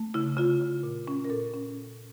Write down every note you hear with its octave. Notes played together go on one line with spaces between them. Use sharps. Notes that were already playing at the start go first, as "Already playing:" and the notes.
Already playing: A3
C#3 E4
C#3 F4
C#3
A#2
C#4
A#4
A#2 A4
C#4